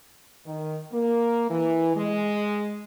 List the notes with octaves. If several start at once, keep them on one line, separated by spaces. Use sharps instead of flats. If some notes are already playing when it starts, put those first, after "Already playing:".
D#3
A#3
E3
G#3